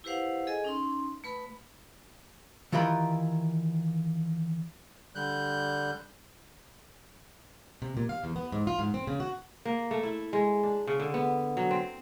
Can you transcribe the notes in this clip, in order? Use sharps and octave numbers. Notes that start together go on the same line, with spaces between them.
E4 G4 B4 C5 F5 F#5
G#4 A4 D#5 G#5
C#4 D#4 C6
A3 B4 B5
D#3 E3 F4 G4 A#4 B5
D3 G3 F#6 G6
C3
A#2
F5
E2
B3
G#2
F4
G#2
C4
C#3
F#4
A#3
A3
E4
G#3
D4
C#3
D3
B3
F#3
C4